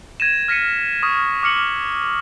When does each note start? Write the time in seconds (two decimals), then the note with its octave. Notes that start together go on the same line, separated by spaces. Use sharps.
0.20 G#6 A#6 D#7 E7
0.48 F6 A#6 B6 C#7 D#7
1.02 C#6 D#6 F6
1.43 D6 F6 C#7 F#7